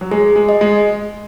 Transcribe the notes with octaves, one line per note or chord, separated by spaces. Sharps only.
F#3
G#3 G#4
G#3
D#5
G#3